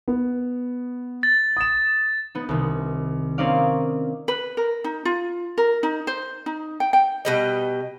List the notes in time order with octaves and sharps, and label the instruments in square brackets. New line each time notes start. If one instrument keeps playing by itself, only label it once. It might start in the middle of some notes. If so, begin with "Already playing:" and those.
[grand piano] B3
[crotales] A6
[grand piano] D#6 E7
[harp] B3 D#4
C2 D#3
A#3 C4 C#4 D#4 D5 F5
[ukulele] B4
A#4
D#4
F4
A#4
D#4
C5
D#4
G5
G5
[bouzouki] B2 G3 D#5